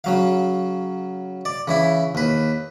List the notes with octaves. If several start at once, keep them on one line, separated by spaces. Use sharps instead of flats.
C#3 F#3 F5
D5
C#3 E3 E4
D#2 B4